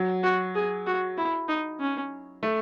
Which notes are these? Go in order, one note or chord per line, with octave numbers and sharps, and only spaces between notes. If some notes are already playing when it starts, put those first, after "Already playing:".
Already playing: F#3
F#4
G#4
F#4
E4
D#4
C#4
A3